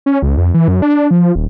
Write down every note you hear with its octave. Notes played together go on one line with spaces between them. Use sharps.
C#4
C#2
F2
E3
F#2
D4
F3
D#1